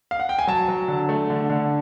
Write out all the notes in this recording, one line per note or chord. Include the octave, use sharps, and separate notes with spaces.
F5
F#5
G5
G#5
F#3 A5
F#3
D3
A3
D3
D3